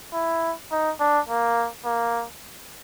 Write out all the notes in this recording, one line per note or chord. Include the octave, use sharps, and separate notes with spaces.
E4
D#4
D4
A#3
A#3